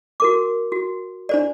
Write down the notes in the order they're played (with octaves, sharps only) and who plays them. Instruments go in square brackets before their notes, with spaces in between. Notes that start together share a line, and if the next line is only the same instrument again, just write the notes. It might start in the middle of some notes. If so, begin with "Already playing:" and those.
[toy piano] F#4 A#4 D6
F#4
D4 C5 D5